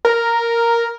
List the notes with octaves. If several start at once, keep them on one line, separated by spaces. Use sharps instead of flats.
A#4